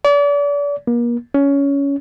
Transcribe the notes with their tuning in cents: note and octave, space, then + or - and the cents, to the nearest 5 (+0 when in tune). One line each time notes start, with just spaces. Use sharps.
D5 -40
A#3 +35
C#4 +15